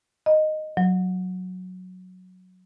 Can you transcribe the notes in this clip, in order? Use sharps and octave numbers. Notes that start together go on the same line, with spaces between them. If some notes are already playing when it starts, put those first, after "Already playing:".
D#5
F#3